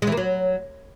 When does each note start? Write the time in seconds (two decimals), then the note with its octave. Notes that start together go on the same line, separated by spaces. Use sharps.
0.02 G#3
0.07 E3
0.12 A#3
0.17 F#3